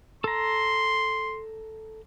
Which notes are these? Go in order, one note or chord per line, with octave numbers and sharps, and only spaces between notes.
A4 A#5 C6